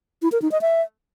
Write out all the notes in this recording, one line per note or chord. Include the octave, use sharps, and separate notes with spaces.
E4
A#4
D#4
D#5
E5